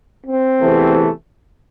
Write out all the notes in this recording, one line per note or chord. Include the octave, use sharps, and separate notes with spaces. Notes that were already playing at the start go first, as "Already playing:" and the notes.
C4
E2 C3 E3 A3